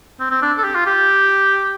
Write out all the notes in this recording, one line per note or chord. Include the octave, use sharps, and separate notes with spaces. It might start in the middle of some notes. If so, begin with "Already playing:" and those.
C4
C4
D4
A4
G4
F4
G4